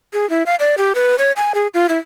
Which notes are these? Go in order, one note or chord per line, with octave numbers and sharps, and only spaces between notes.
G#4
E4
F5
D5
G4
B4
C#5
G#5
G#4
F4
E4